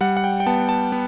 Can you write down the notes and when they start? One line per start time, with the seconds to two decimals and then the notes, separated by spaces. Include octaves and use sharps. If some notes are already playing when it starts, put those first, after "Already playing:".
0.01 G3 F#5
0.17 F#5
0.24 G5
0.40 G5
0.46 B3 A5
0.69 A5
0.92 B3